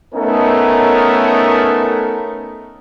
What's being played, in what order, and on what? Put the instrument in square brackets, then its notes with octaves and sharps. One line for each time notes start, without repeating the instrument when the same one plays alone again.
[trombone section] A3 B3 C#4 D#4 A4 A#4